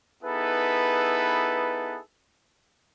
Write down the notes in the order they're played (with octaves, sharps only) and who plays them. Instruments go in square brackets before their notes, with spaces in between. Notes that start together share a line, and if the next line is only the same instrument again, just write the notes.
[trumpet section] B3 D#4 E4 G#4 A4 B4